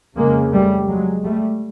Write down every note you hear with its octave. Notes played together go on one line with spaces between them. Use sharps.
F2 C#3 G#3 A#3
G3 A3
F#3 G#3
G3 A3